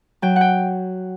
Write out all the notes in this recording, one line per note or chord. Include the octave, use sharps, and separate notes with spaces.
F#3 G5
F#5
G5